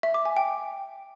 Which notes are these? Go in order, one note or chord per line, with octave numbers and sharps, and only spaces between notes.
E5
D6
G#5
G5